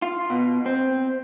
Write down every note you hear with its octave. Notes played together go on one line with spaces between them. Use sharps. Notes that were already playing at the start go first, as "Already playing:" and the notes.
F4
B2
C4